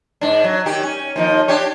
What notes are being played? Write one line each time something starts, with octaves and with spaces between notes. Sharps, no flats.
G#2 D4
F#3
D#3 G4
C#4
D#2 F3 D#4
D4 G4 C#5